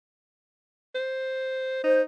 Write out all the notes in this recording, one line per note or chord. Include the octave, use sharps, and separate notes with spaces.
C5
D#4 C5